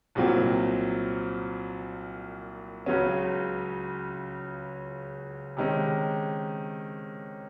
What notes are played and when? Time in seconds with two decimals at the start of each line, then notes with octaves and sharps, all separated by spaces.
0.15 C2 A#2 F#3 C4
2.86 C#2 C#3 F#3 C#4
5.57 C3 D#3 G#3 C#4